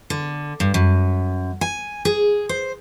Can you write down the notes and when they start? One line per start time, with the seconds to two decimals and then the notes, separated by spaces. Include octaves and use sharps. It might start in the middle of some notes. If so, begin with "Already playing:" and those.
0.10 D3
0.60 G2
0.74 F#2
1.61 G#5
2.05 G#4
2.49 C5